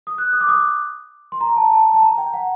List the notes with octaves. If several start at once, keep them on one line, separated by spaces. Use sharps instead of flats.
D#6
F#6
D#6
D6
D#6
C6
A#5
A5
A5
A5
A#5
G5
F#5